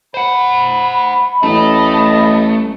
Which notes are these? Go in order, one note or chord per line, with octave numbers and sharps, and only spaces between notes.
C5 F#5 B5
A1 A3 D#5